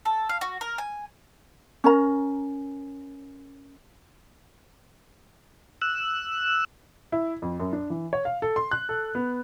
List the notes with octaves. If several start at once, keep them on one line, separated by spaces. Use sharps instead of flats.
A4
F5
F#4
A#4
G#5
C#4 A#4 A#5
E6 F#6
E4
F2
F#2
D4
E3
C#5
F5
A4
C6
F#6
A4
B3